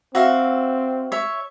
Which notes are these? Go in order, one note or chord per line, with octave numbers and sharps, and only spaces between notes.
C4 F#4 E5 F5
C#5 E5